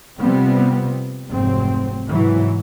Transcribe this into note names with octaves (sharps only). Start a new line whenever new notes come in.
C3 F3 G3 B3 C4
F1 G#2 F#3 C4
G#2 C3 E3 F#3